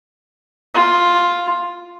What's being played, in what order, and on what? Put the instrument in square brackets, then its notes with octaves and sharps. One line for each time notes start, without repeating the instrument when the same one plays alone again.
[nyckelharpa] F4